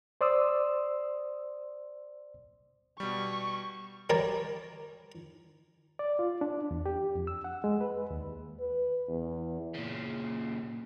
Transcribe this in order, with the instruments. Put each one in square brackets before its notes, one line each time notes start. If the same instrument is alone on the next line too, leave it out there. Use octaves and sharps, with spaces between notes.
[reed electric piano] C5 D5 C6 D#6 E6
[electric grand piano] B2 G3 [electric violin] C#6
[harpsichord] G3 A#4 C#5 A5
[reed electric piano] D5
F4
D4
E2
G4
F2
E6
F#5
G#3
B4
D#2
[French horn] B4
E2
[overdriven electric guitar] A#2 C#3